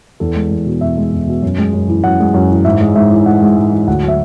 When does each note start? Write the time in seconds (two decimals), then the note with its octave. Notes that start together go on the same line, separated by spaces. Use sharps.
0.20 E2 A4
0.36 G#3
0.51 E2
0.66 B2
0.81 E2 E5
0.97 G#3
1.13 E2
1.27 B2
1.43 F#2
1.58 G#3
1.73 F#2
1.88 E3
2.04 F#2 F#5
2.20 G#3
2.34 F#2
2.50 E3
2.65 G#2 E5
2.81 G#3
2.96 G#2 E5
3.11 E3
3.26 G#2 F#5
3.42 G#3
3.57 G#2
3.72 E3
3.87 D2 F#5
4.03 F#3
4.08 E5